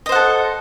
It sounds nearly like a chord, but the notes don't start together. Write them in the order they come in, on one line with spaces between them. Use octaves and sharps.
D#5 C5 F#5 A4